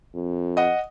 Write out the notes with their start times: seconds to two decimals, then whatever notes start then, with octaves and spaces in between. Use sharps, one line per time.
0.15 F2
0.57 D#5 F#5